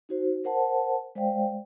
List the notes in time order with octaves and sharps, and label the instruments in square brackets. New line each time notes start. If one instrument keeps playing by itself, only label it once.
[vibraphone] D#4 F#4 C5
A#4 C5 F#5 A5
G#3 C5 D5 F5 G5